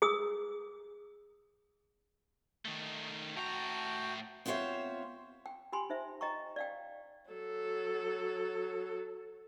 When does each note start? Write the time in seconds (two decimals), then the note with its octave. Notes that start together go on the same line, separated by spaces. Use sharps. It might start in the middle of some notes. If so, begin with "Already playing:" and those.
0.02 G#4 D#6 E6
2.65 D#3 A3
3.36 A2 F#4 G5 A5 A#5
4.46 B3 C4 F4 C5 C#5 E5
5.46 G5
5.72 G4 G5 G#5 B5 C6
5.90 D#4 C5 E5
6.21 D#5 G5 A#5 C#6
6.56 D5 F5 G5
7.31 F#3 A4